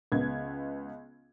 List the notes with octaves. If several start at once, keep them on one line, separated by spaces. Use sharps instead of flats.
C#2 B3 G#6